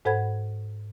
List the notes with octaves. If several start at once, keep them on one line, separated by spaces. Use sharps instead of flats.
G#2 A4 C5 F#5 B5 G#6